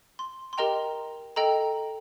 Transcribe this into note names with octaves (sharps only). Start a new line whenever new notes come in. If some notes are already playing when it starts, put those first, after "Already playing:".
C6
C6
G4 A#4 D#5 G5 A#5
A4 D#5 G5 A#5